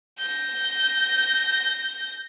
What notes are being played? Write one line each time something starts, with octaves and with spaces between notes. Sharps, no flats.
G6 A#6